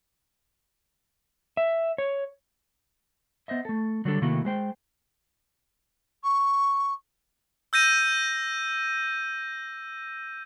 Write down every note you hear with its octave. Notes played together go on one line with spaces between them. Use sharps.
E5
C#5
B3 C5 D#5 E5
A3 A4
D3 F#3 G3 A3 D4 A4
C3 D#3 A3 A#3 E4 F#4
G#3 C5 G5
C#6
E6 G6 A#6 D#7